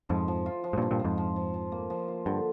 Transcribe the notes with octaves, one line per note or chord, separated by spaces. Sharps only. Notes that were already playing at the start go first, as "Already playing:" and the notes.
F2 G#2 F3
F3
F4
F3
G#2
G2 A#2 F4
G2 A#2
F3
F2 G#2
F3
F3
F3
A#3
F3
F4
G2 D3